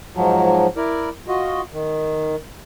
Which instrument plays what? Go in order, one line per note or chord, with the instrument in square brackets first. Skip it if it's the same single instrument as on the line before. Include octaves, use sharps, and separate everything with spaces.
[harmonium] G#2 F3 F#3
E4 A#4 D5
F4 F#4 D#5
D#3